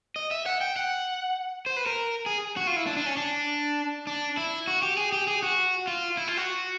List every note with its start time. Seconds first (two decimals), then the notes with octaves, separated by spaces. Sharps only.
0.16 D#5
0.31 E5
0.46 F#5
0.61 G5
0.76 F#5
1.66 C5
1.76 B4
1.86 A#4
2.26 G#4
2.57 F#4
2.67 F4
2.76 E4
2.87 D4
2.97 D4
3.06 C#4
3.17 D4
4.07 D4
4.37 E4
4.67 F#4
4.82 G4
4.97 G#4
5.12 G4
5.27 G#4
5.43 F#4
5.87 F4
6.17 E4
6.28 F4
6.37 F#4